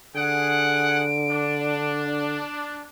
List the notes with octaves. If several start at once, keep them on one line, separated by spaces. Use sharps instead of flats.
D3 G#4 F#5 D7
D4